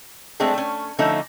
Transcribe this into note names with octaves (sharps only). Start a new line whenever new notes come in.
G#3 A3 C4 D4 G#4
A3 C#4
D3 F3 A3 C#4 D#4